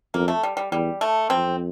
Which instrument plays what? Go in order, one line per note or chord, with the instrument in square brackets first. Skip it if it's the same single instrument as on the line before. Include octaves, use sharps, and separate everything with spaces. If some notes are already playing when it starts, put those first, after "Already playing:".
[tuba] F2 [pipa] A#3
[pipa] A3
G3
G3
[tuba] E2 [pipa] G3
[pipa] A3
[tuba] F2 [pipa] C4